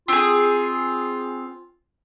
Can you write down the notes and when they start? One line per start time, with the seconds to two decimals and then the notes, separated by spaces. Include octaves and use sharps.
0.08 C4 F4 G#4